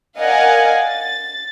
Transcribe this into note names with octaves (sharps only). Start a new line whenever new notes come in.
A#4 D5 D#5 F5 F#5 G#5
A6